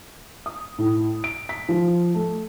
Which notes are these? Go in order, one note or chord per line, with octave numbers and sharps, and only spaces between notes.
D#6
A2
D7
B6
F3
A3